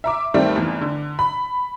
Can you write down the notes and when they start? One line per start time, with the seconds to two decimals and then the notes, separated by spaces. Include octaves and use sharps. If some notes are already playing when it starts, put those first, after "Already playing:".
0.04 E5 A#5 D6
0.34 G2 D#3 G3 A3 C4
0.56 F1 E2
0.81 D3
1.19 B5